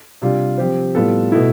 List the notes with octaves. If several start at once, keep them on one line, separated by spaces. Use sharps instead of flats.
C3 G3 D4 F4
F3 C4 G4 C5
A2 G3 B3 F4 A4
B2 A3 E4